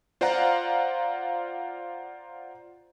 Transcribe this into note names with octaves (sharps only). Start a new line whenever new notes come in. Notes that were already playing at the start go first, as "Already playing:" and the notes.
F4 C5 D5 F5 F#5 A#5